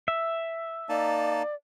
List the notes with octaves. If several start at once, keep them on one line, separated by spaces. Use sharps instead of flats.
E5
A#3 D#4 D5 A5